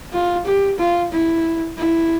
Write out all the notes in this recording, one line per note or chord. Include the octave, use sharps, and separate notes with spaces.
F4
G4
F4
E4
E4